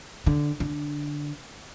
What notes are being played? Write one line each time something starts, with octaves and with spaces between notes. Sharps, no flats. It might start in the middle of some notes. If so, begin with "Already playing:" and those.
D3
D3